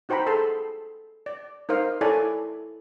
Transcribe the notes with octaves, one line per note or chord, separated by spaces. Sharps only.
D#4 F#4 C5 G5 A#5 B5
G#4 A4 A5 C6
D5
D#4 A#4 C5 F5
E4 A4 C#5 D5 G#5